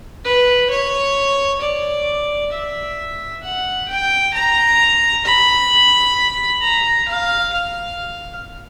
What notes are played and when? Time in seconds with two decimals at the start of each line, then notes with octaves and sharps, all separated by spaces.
0.25 B4
0.70 C#5
1.61 D5
2.52 E5
3.43 F#5
3.88 G5
4.34 A#5
5.25 B5
6.61 A#5
7.08 F5
7.53 F5